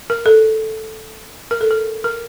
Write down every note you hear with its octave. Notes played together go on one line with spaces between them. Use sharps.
A#4
A4
A#4
A4
A#4
A#4